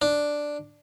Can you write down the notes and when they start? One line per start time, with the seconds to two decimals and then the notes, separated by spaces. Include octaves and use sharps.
0.02 D4